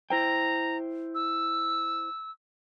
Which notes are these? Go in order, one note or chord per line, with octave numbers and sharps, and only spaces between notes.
E4 C5 G5 A#5
E6